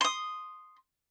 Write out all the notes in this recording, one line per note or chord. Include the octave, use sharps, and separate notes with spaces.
C6 D#6